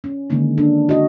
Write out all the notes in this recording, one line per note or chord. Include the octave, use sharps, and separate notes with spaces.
C#4
D3 D#3 G#3 A#3 D#4
D4 A4
F#4 D#5